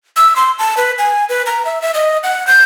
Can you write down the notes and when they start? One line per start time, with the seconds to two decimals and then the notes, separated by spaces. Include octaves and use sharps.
0.17 E6
0.36 C6
0.59 A5
0.77 B4
0.98 G#5
1.29 B4
1.46 A#5
1.65 E5
1.82 E5
1.94 D#5
2.23 F#5
2.47 G6